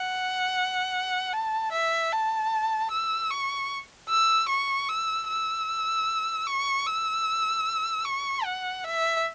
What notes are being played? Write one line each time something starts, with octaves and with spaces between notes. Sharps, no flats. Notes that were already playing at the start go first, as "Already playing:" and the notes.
Already playing: F#5
A5
E5
A5
E6
C#6
E6
C#6
E6
E6
C#6
E6
C#6
F#5
E5